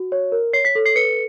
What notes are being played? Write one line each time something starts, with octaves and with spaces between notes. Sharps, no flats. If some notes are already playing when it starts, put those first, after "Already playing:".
Already playing: F#4
C#5
A#4
C#5 C7
B6
A4
C7
B4 C#7